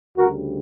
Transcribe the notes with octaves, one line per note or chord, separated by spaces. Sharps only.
D2 C#3 G3 F#4 A#4